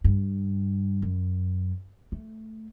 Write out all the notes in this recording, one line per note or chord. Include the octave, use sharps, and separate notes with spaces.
G2
F#2
A3